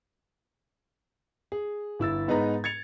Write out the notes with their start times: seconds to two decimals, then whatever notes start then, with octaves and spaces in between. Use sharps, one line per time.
1.52 G#4
1.99 G1 E4 E6 A6
2.28 G#2 B3 D#4 G#4 B4 A#5
2.64 G#6 A6 C#7 F7